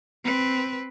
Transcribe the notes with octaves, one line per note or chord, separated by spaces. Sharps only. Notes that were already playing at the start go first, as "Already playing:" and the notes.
C4 B4